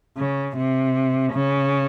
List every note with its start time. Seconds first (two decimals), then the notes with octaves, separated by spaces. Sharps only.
0.17 C#3
0.57 C3
1.33 C#3